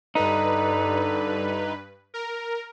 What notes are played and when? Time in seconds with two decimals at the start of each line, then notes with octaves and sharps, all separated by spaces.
0.15 G2 D3 D#4 B4
2.14 A#4